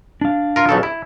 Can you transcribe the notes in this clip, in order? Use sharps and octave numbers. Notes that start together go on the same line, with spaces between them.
D4 F5
F4 A#4
B1 C#3 A4
E4